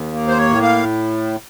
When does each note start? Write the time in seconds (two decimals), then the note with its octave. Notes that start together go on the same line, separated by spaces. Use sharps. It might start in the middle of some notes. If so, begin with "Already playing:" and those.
Already playing: D#2
0.13 A#3
0.28 C5
0.37 C#5
0.49 A2
0.62 F5